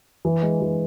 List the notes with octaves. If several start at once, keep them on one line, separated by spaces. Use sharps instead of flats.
E3
G#3
E3